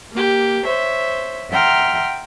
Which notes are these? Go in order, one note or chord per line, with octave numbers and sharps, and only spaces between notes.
A#3 G4
C5 C#5 E5
E5 F#5 G5 A#5 C6 F6